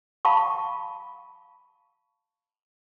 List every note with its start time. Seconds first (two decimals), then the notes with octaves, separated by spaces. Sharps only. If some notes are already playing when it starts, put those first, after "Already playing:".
0.25 F5 A5 B5 C#6